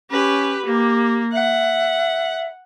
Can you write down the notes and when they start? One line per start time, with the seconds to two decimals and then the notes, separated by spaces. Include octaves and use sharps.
0.11 C#4 G4 B4
0.65 A#3 G4
1.33 E5 F#5